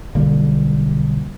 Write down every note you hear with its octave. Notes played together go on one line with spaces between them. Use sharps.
B1 D3 G3 A#3